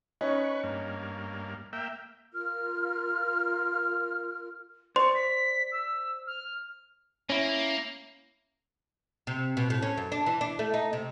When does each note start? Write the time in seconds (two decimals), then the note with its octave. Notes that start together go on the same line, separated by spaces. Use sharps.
0.21 C#4 D#4 B4 C#6
0.63 G2 A#3
1.73 A#3 E5 G5
2.32 F4 A#4 F6
4.96 C5 D5 C6 C#6
5.14 B6
5.72 E6
6.27 F6
7.30 A#3 C#4 E4
9.27 C3
9.57 B2
9.70 A2
9.82 C#4
9.97 F#2
10.12 D4
10.26 E3
10.41 D4
10.59 A3
10.74 D#4
10.93 C3